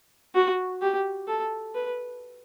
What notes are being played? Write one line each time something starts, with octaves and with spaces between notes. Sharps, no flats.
F#4
G4
A4
B4